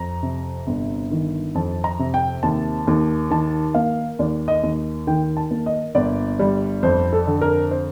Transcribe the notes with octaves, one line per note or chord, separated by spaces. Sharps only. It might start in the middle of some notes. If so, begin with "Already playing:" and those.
Already playing: F2 A#5
C3
G1
D#3
F2 A5
A#5
C3
G5
D#2 A5
D#2
D#3 A5
A#3 F5
D#2 D5
D#5
D#2
D#3 G5
A5
A#3
D#5
G1 D5
G3
F2 C5
A4
D3
A#4
C5